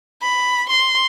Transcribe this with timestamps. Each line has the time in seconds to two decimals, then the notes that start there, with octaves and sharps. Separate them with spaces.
0.22 B5
0.69 C6